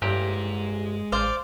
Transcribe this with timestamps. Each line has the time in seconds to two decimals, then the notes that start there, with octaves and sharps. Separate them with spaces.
0.02 A1 G2 A#2 G#3 G4 A#5
1.12 A1 C5 D5 F5